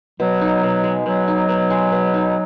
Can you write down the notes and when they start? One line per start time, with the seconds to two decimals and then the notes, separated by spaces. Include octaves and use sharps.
0.20 B2 F#3
0.41 D#4
0.63 B2
0.84 G#3
1.06 B2 F#3
1.28 D#4
1.49 B2
1.70 G#3
1.92 B2
2.14 D#4